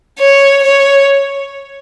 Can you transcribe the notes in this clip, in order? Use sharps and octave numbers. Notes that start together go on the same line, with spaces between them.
C#5
C#5